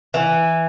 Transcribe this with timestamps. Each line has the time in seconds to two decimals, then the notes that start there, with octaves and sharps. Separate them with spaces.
0.14 E3